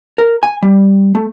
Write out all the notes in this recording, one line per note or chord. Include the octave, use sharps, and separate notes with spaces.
A#4
G#5
G3
A3